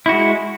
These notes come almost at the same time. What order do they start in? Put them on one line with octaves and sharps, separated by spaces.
E4 F#4 G#3